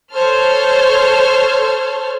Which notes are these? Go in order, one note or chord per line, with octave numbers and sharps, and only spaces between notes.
A4 C5 C#5 F6